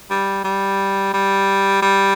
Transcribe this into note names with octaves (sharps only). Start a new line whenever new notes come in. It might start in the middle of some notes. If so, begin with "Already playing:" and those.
G3
G3
G3
G3